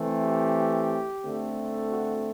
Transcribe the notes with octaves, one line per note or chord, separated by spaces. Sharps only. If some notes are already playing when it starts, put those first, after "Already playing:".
Already playing: E3 A3 C4
G4
D3 A3 C4
F#4